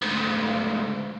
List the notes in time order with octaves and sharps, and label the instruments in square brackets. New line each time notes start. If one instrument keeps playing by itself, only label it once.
[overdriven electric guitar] D2 G#2